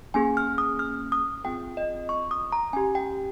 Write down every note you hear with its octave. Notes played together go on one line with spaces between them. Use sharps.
A#3 C#4 G#4 G#5
F6
D#6
F6
D#6
C4 F4 G#4 G5
D#5
C#6
D#6
A#5
C#4 G4 G#5
G5